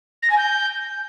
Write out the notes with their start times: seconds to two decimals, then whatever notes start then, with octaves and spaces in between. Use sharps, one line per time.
0.23 A#6
0.30 G#5
0.38 G6